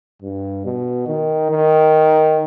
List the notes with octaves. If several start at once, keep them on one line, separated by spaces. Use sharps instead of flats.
G2
B2
D#3
D#3